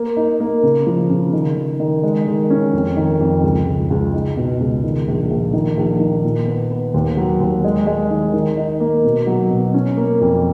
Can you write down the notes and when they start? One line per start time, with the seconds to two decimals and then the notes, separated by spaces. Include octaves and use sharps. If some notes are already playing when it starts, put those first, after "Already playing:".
Already playing: A#3
0.17 D#4
0.40 A#3
0.63 C#3
0.87 F3
1.10 C#3
1.33 D#3
1.57 D#3
1.80 D#3
2.03 G#3
2.27 D#3
2.50 C#4
2.73 F2
2.97 D#3
3.21 F2
3.43 C#2
3.67 C#2
3.90 C#2
4.13 D#4
4.37 B2
4.60 C#2
4.84 D#3
5.08 A#1
5.31 A#1
5.53 D#3
5.77 A#1
6.00 D#3
6.24 A#2
6.47 B3
6.71 B3
6.94 D#2
7.17 F#3
7.40 D#2
7.64 G#3
7.87 G#3
8.11 D#3
8.34 D#3
8.57 D#4
8.80 A#3
9.04 B2
9.27 F#3
9.50 B2
9.74 C#4
9.97 A#3
10.21 F2